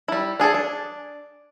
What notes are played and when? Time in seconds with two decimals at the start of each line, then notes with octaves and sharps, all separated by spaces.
0.08 G3 E4
0.40 D4 G#4 A4 D5
0.54 D4